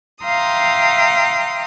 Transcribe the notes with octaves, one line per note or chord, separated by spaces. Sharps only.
E5 F5 G5 A#5 C6 D#6